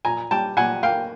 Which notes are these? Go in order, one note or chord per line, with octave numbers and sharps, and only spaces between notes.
A#2 G#5 A#5
G3 G5 A5
A#2 F#5 G#5
A#3 F5 G5